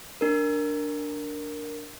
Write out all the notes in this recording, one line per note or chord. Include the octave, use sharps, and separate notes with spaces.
D4 A#4